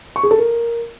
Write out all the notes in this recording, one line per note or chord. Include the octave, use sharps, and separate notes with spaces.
C#6
G#4
A4
A#4